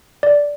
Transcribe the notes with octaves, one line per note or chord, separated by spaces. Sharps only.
D5